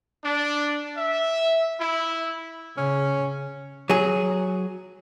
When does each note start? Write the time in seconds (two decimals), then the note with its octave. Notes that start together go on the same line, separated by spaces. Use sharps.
0.23 D4
0.96 E5
1.78 E4
2.77 C#3 C#4
3.90 F#3 G#4